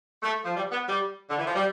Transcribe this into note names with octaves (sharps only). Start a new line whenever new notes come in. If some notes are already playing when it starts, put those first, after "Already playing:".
A3
F3
G3
B3
G3
D3
E3
F3
G3